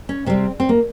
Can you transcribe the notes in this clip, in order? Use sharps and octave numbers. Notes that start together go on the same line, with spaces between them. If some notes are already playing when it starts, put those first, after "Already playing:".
C#4
C3 G3 C4
C4
A#3